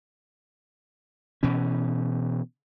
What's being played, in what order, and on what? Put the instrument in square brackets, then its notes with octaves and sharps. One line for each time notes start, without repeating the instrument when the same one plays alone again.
[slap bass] B2 E3 C#4